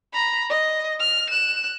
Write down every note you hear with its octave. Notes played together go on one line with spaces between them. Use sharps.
A#5 B5
D#5
F6
F#6 E7